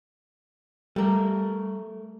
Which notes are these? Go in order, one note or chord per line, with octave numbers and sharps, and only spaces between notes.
G3 A3 A#4